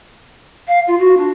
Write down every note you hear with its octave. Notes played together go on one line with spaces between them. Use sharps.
F5
F4
F#4
D4